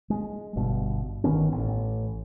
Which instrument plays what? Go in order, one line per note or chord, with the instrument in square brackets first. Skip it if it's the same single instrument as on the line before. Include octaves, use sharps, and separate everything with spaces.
[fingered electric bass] G#3
G1 G2 B2
G1 D#3 B3 C#4
A1